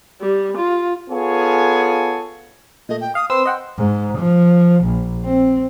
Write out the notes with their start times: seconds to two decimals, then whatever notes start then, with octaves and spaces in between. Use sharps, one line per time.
0.21 G3
0.57 F4
1.10 B3 F4 G#4 A4 C#5 G#5
2.89 A#2 A3 D#5
3.01 G5
3.15 F5 D#6
3.30 C4 B4 C6 E6
3.46 D#5 F#5 G5
3.78 G#2
4.18 F3
4.85 A#1
5.25 C4